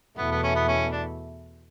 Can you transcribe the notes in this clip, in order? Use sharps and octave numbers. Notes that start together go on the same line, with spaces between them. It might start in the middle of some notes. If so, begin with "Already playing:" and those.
E2 B2 A3 B3 E4
B3
C#4
B3
C#4
D4